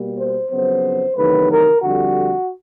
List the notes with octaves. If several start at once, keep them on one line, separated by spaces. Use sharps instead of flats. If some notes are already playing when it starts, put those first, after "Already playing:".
Already playing: B2 G3 A#3
C5
F2 C#3 F#3 B3 C5
E2 C3 D#3 F#3 A3 B4
A#4
F2 D3 G3 F#4